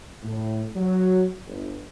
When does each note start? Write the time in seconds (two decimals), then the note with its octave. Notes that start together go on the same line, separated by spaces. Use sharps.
0.23 A2
0.76 F#3
1.47 G1